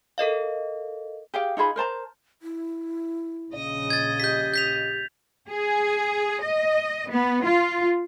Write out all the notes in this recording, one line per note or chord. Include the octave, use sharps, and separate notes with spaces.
A4 A#4 D#5 F5
G4 G#4 F5 G5
D#4 F4 G#4 B5
A#4 C5 A5 A#5
E4
A#1 C#3 D#5
G#6 A6
G4 G6 B6
G6 B6 F7
G#4
D#5
B3
F4